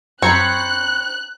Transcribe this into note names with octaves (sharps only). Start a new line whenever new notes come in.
F#2 C4 C#5 A#5 B5 C#6 F#6 C#7